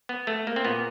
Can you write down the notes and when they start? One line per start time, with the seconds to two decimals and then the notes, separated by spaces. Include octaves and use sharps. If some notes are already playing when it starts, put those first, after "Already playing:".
0.09 B3
0.27 A3
0.47 A#3
0.56 C4
0.65 A#2 B3